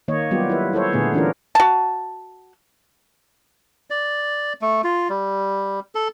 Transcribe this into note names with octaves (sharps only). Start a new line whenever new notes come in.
D#3 A#3 C#5 D#5
F#3 G3 B3 F4 G4
E4 B4
E4 A4 C5 C#5
A#2 D3 A3 B3 G#4
E3 C#4 D4 F4 A#4
F#4 A5
D5
A3
F4
G3
A4